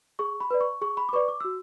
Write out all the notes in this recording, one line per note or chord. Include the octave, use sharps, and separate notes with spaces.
G#4 C#6
B5
B4 D5
C#6
G#4 C#6
B5
D6
B4 D5 C#6
D6
F#4 E6